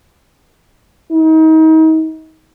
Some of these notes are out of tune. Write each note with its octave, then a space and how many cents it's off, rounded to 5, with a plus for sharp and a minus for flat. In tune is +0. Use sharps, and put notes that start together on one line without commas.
D#4 +35